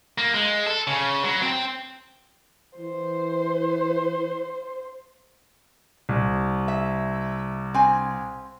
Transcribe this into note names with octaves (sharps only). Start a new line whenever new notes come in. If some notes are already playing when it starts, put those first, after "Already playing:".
A#3
G#3
A4
C#3
F#3
C4 G5
E3 C5
C2
E5
C4 G#5